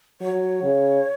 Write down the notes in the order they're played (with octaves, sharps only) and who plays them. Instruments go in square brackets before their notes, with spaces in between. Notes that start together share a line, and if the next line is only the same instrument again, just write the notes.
[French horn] F#3 [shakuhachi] C#5
[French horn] C#3